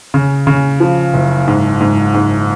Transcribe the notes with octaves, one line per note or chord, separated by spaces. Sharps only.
C#3
C#3
F3
F#1
G#2
G#2
G#2